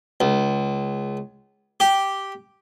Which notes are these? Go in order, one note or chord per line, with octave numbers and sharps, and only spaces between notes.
C#2
G4